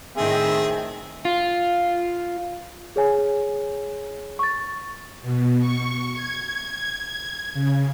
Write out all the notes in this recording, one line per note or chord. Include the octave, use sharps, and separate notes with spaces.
A2 D#3 C4 G#4 E5
F4
G#4 C#5 G#5
C#6 A6
B2
C#6
G#6
C#3